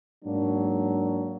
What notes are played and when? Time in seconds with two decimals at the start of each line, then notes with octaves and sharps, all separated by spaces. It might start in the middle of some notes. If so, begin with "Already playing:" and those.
0.25 G#2 F#3 A#3 D4